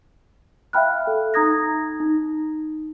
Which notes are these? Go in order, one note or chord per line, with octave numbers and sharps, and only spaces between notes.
E5 F5 G5 B5 F6 F#6
A4
D#4 A#5 D#6 G#6 A#6
D#4